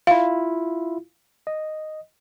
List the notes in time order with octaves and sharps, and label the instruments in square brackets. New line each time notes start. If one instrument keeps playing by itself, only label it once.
[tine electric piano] E4 F4 [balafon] F5
[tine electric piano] D#5